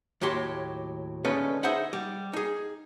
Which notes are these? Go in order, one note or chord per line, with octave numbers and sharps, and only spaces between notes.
D#2 A2 F#3 G4 C6
D2 G#3 C#4 D#4 A4 B4
D#4 G#4 C5 E5 F#5 B5
G3
D#4 G#4